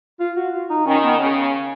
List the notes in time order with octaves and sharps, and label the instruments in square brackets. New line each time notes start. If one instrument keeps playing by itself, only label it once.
[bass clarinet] F4
F#4
F4
D#4
[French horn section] D#3 [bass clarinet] C#4
[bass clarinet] B3
[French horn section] C#3